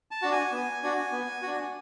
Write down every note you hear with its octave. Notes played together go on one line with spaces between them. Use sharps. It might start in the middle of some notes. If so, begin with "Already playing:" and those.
A5
D4 F#4
G#5
B3
D4 F#4
B3
D4 F#4